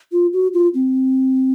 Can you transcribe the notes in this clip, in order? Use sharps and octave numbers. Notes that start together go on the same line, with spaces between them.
F4
F#4
F4
C4